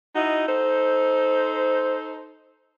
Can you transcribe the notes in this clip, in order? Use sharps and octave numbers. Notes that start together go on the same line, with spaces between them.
D#4 E4 F#4 D#5
D#4 A4 C5